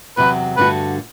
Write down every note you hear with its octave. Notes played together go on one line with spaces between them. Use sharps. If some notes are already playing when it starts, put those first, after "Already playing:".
E2 C3 F#3 B4
G2 D3 A3 D4 F#4 B4